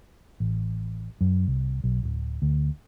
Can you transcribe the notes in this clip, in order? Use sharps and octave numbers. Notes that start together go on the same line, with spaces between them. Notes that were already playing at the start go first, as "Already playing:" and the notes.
A1
F#2
C2
B1
D1
D2